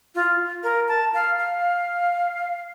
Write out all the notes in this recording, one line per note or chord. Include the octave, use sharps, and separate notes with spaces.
F4
A#4
A5
F5
F5